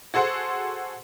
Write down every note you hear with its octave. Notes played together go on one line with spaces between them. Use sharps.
F#4 G#4 A4 C5 F#5